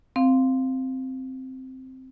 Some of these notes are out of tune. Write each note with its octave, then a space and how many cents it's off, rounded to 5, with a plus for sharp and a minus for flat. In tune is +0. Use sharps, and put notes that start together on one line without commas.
C4 +0 F5 +0